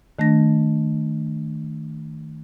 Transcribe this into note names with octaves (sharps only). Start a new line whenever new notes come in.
D#3 A3 D4 A#6